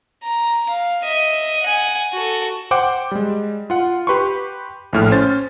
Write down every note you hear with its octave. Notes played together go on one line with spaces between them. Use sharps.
A#5
F5
D#5 E5
F#5 G#5
F#4 A4
C5 F#5 G5 D6
G3 G#3
F4 F#5
G4 B4 C6 C#6
A#1 A2 F6
C#4 C5 A6